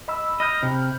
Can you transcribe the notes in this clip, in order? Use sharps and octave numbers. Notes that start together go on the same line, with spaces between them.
D#5 B5 E6
D#5 B5 F6 G6
C3